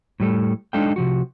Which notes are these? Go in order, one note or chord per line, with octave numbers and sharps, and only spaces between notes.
A2 G3 A4
G#3 D4 D#4 A4 F5 G5
C3 F3 F#4